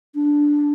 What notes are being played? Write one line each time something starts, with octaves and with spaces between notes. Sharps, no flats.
D4